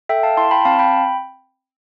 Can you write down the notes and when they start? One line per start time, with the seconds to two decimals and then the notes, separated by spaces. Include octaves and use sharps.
0.09 A4 E5 G5
0.23 F5 A5
0.37 E4 A5 C6
0.51 G5 B5
0.65 C4 F5 A5
0.79 G5 B5